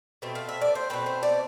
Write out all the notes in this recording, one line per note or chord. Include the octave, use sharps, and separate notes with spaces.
B2 A3 C4
F5
E5
D5
C5
B2 A3 C4 B4
C5
D5